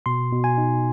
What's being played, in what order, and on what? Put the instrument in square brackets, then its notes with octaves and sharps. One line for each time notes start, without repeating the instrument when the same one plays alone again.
[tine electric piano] B2 C6
B2
G#5
D#4